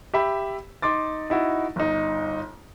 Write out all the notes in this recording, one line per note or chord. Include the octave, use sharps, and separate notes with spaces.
G4 E5 B5
D#4 C6 D6 A6
D#4 E4 F#4
G1 D#4